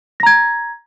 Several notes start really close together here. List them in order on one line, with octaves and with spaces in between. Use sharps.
A#6 A#5 G#6